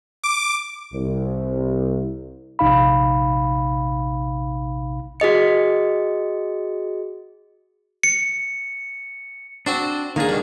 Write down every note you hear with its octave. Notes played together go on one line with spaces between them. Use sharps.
D6
C2
A#1 C3 D#4 F5 B5
F#4 G#4 D#5 C#7
C#7
C4 D4 F#4 C5
D#3 A#3 D4 G#4 F5
B2 G3